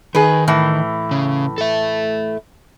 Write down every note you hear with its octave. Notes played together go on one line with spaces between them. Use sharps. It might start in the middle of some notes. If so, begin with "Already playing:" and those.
D#3 G#4 B4
A2 E3
C#3
A4 E5